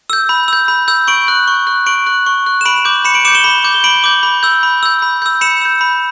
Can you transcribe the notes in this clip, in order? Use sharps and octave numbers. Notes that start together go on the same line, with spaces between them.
E6 G6
B5
E6 G6
B5
E6 G6
C#6 D7 F#7
F#6
C#6
F#6
C#6 D7 F#7
F#6
C#6
F#6
E7
B5 D7 F#7
D6 G6
B5 C#7 E7
D7 F#7
D6 G6 C#7 E7
E7 G7
B5
D6 G6
G7
B5 D7 F#7
D6 G6
B5
E6 G6
B5
E6 G6
B5
E6 G6
B5 C#7 E7
E6 G6
B5